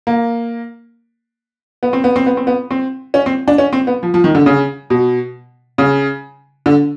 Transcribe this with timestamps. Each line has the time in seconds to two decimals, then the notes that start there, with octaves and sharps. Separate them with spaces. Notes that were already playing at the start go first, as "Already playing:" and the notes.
0.07 A#3
1.83 B3
1.93 C4
2.04 B3
2.16 C4
2.26 B3
2.37 C4
2.47 B3
2.71 C4
3.14 C#4
3.26 C4
3.48 D4
3.58 C#4
3.73 C4
3.87 B3
4.03 F3
4.14 F3
4.24 D#3
4.35 D3
4.46 C#3
4.90 B2
5.78 C#3
6.66 D3